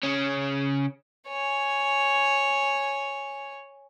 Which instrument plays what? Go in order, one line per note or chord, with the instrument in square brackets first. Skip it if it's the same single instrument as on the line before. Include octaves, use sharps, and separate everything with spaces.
[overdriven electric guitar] C#3 C#4
[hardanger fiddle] C#5 G#5